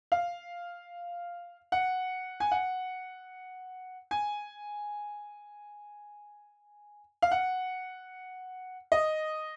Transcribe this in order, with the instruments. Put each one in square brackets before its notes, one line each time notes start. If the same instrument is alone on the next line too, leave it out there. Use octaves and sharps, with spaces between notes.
[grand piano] F5
F#5
G#5
F#5
G#5
F5
F#5
D#5